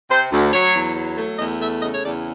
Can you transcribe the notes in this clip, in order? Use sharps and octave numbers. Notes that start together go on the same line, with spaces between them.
C3 C5
D2
F#3 C#5
E2
F#3
A3
E2 D#5
A3 E5
C#3 D#5
C#5
E2 D5